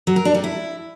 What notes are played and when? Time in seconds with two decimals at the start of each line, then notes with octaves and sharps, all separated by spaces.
0.07 F#3
0.16 A#4
0.25 D4
0.34 G3
0.44 E4